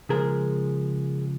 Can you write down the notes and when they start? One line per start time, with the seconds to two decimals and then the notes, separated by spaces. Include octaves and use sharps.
0.09 C#3 F3 G#3 G#4 A#4